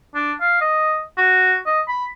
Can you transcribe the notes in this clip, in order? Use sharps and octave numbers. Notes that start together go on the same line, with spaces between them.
D4
F5
D#5
F#4
D#5
B5